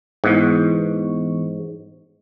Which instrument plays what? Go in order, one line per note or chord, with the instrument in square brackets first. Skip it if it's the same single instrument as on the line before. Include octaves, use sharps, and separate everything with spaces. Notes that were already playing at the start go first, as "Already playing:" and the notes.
[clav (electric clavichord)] G#2 [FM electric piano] E3 B3 C#6